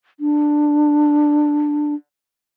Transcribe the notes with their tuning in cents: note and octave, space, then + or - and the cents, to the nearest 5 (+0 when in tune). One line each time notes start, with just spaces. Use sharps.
D4 +10